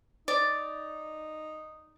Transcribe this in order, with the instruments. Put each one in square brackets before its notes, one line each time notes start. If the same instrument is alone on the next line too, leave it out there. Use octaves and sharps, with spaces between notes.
[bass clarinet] D#4 [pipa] D5